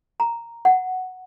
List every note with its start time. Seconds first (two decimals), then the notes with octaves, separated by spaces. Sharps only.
0.20 A#5
0.65 F#5